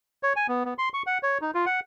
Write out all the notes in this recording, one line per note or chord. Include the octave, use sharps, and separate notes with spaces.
C#5
G#5
B3
B3
C6
C#6
F#5
C#5
D#4
F4
F#5